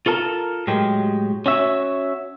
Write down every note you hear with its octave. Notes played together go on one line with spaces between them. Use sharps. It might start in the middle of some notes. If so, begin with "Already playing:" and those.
F4 A4 A#4 A5
A2 F#3 G#3 G4
C#4 F#4 C#5 E5